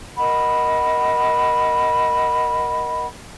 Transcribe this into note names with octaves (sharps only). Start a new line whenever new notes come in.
A#4 D#5 F#5 B5